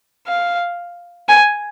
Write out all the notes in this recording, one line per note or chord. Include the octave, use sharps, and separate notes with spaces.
F5
G#5